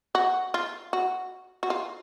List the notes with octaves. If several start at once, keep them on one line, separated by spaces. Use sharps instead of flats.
F#4
F4
F#4
F#4
F4